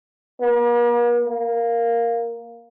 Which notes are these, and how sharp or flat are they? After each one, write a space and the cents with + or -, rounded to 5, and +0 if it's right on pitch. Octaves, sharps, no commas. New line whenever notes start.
A#3 +45
A#3 +0